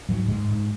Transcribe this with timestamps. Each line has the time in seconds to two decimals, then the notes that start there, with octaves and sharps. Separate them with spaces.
0.09 G#2 F#3
0.28 G#2 G#3
0.48 G#2